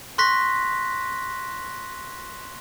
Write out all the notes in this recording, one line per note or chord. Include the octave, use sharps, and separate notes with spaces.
C6 C#6 F#6 A#6 B6